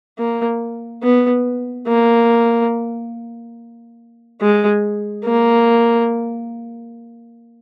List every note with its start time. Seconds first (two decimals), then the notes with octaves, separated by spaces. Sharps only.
0.18 A#3
1.03 B3
1.87 A#3
4.41 G#3
5.25 A#3